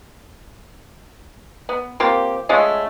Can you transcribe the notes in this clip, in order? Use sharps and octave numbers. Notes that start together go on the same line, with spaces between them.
B3
A#3 C4 F4 G4
G#3 A3 C#4 F4